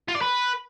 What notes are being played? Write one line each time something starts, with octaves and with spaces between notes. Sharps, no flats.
F4
D5
B4